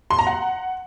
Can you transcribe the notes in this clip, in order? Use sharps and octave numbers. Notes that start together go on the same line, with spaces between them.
C6
A#5
F#5